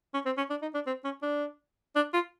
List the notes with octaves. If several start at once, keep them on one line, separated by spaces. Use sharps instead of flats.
C#4
C4
C#4
D4
D#4
D4
C4
C#4
D4
D4
F4